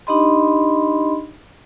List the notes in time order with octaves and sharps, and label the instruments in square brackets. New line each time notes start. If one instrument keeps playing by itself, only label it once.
[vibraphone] D4 D#4 G4 D#5 B5 C6